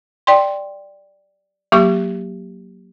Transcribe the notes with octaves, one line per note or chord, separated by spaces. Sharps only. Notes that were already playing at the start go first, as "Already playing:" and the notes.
D5 G5 C6
F#3 A#3 G4 C#6 D6